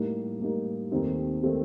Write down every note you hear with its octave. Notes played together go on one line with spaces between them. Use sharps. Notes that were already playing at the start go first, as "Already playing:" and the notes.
Already playing: A2 G3 A#3 D#4
A2 G3 A#3 D#4
D#2 D#3 A3 C4 D#4
D#3 A3 C4 D#4